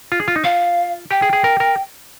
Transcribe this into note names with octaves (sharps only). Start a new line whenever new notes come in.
F4
G#4
F4
D#4
F4 F5
G4 G5
G#4
G#4
A#4
A#4